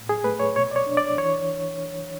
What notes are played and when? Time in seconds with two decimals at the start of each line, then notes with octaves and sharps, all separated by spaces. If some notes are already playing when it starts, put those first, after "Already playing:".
Already playing: A2
0.09 G#4
0.24 A3 B4
0.40 C#5
0.56 B2 C#5
0.71 D5
0.76 C#5
0.86 D4
0.97 D5
1.18 E3 C#5